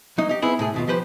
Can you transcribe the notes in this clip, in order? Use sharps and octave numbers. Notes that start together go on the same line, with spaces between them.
F#3 A#3 D#4
D#4 G4
B3 C4 E4 G#4 B4
A2 C3 G#4
D#2 B2 F4
F3 G4 B4 C5